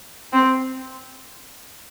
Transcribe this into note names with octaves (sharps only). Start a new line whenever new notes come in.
C4